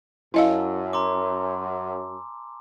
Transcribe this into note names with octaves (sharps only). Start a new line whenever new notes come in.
F#2 E4 D#5 F5 G#5 A5 E6
A#5 C6 D6